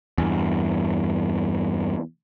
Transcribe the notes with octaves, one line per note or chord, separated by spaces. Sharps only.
E2 G2